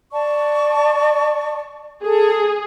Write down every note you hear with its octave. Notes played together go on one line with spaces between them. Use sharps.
D5 A5 C#6
G#4 A4